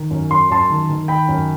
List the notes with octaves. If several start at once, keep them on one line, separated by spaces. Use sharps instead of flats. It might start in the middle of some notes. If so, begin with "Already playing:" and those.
Already playing: D#3
F#2
F#2 C6
F#2 A5 C6
D#3
D#3
D#3 G5 B5
F#2